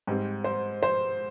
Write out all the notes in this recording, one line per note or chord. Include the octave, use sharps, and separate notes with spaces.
G#2 G3 C4
C5
C5